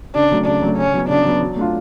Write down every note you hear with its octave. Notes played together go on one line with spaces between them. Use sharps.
C#3 D4
F#3 A3
C#3 D4
F#3 A3
C#3 C#4
F#3 B3
C#3 D4
F#3 B3
F#3
A3 D4 F4